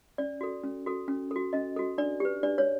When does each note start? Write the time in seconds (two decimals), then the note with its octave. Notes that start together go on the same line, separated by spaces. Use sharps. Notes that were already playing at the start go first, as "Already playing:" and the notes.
0.18 C#4 D5
0.41 F#4 A4
0.64 C#4
0.86 F#4 A4
1.08 C#4
1.31 F#4 A4
1.53 C#4 D#5
1.76 F#4 A4
1.98 D4 D5
2.20 G4 B4
2.43 D4 D5
2.58 C#5